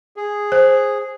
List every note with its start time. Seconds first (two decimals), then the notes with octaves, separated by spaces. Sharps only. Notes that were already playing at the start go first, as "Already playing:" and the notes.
0.16 G#4
0.52 C5